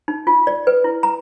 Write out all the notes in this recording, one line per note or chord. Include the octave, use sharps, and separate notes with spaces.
D#4
F4
D5
B4
E4
A#5